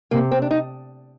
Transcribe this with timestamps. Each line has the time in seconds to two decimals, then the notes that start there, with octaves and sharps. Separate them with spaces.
0.11 C3 A#3
0.31 C4
0.42 D4
0.51 D#4